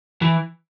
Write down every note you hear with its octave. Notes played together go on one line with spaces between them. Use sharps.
E3